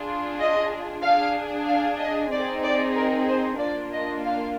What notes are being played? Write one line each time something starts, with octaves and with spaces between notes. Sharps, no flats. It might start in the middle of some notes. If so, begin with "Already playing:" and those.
Already playing: D4 F4 G#4
D#5
D4 G#4 F5
F5
D#5
C4 D#4 G#4 D5
D5
A#4
C5
A#3 D4 F4 D5
D#5
F5